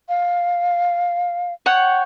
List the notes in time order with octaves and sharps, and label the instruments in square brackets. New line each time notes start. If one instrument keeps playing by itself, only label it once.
[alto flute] F5
[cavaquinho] C#5 F#5 G5